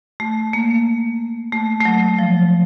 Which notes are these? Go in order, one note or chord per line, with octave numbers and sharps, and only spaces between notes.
A3
A#3
A3
A3
F#3
F3